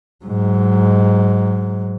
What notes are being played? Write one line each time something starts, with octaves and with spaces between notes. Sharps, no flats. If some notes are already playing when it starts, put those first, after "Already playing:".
G#2 F#3